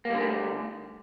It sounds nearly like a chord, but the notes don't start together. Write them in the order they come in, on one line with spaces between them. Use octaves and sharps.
A#3 G3 D3 A3